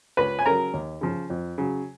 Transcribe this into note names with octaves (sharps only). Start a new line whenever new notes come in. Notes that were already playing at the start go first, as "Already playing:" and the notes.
C#2 B4 B5
G#5
C#3 F#3 A#4 A#5
D#2
C#3 F3
F2
C#3 F#3